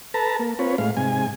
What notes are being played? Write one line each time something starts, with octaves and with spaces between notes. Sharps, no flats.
A4 B4 A5 A#5
A#3
C4 F4 B4 C#5
A2 G#3 F5
G#2 C3 G#5